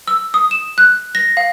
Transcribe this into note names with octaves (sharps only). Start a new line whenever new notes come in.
E6
D#6
E7
F#6
A#6
F5